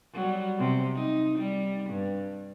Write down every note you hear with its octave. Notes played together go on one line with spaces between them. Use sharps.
F#3 G3
C3
D#4
G3
G2